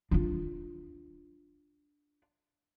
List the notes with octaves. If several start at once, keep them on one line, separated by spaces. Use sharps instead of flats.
D4 F4